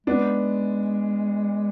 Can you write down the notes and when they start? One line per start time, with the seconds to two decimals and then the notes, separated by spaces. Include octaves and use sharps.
0.07 G#3 B3 D4